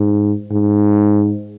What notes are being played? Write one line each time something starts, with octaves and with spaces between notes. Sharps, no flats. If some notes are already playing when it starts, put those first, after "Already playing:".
Already playing: G#2
G#2